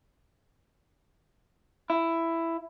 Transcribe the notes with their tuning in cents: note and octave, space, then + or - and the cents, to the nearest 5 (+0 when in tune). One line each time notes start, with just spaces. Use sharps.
E4 +10